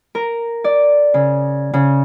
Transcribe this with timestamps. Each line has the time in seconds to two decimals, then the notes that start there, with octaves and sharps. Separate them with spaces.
0.15 A#4
0.64 D5
1.14 C#3
1.74 C#3